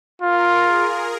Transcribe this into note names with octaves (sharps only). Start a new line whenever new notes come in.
F4 A#4
G#4